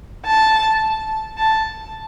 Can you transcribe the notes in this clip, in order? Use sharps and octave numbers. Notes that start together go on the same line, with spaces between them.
A5
A5